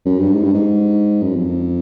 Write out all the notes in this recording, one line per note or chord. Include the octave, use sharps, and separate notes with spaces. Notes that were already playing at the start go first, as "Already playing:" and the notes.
F#2
G2
G#2
G2
G#2
F#2
F2